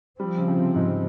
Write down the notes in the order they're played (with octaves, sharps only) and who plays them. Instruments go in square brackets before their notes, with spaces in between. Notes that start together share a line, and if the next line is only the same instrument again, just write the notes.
[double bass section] F3 C4 [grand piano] G3
[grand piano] C#3
C#3
C3
G#2